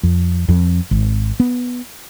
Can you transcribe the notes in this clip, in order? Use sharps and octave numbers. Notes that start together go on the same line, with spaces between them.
F2
F2
G#1
B3